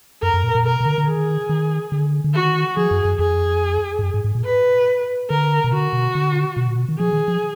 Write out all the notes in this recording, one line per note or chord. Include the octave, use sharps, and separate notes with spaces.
F#2 A#4
F#2
A#2
A#2
B2 A#4
B2
D3
D3
D#3 G#4
D#3
D3
D3
D#3 F#4
F3 G#4
F#2
F#2
F2 G#4
G#2
F#2
G#2
G#2
A#2
B4
D3 A#4
B2
D3 F#4
B2
D3
B2
A#2
B2
D#3
F3 G#4
D#3
F3